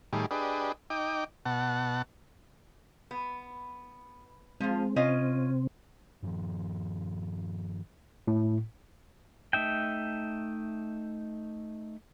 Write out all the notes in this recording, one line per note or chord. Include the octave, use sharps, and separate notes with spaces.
A2 D#3 G3 G#4
D4 G4 G#4 B4 D#5
D#4 G5 D6
B2 F#5 A5
B3
F3 G#3 C4 F4
C3 C4 C#4 F4 D#5
G2 D#3 F3
A2
A3 D#4 E5 G5